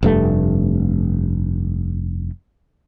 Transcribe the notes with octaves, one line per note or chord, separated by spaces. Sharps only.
F1 G2 A3